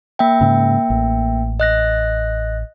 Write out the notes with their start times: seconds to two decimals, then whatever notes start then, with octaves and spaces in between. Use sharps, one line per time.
0.19 A#3 E5 G5
0.41 G#2 C#3
0.90 A1
1.60 D#5 F#6 A#6